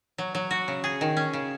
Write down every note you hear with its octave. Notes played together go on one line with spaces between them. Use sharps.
F#3
F#3
F#4
C#3
G#4
D#3
C#4
C#3